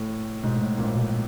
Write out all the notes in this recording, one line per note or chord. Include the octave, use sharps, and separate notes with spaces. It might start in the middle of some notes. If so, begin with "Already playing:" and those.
Already playing: A2
G#2 B2
A2
A#1 A#2
B2